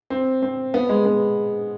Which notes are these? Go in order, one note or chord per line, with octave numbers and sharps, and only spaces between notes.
C4
C4
B3
G#3
B3